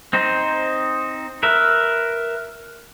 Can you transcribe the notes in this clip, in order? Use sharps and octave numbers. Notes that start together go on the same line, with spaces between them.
C4 D#4 C5
A#4 B4 E5